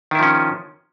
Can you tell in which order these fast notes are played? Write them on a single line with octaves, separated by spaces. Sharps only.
D#3 E4 F3 C#4